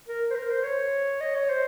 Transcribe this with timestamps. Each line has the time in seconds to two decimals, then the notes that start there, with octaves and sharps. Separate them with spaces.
0.08 A#4
0.31 C5
0.36 A#4
0.51 C5
0.64 C#5
1.21 D#5
1.35 C#5
1.50 C5